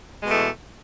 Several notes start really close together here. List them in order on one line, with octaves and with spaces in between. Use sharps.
G#3 B2 A3 E3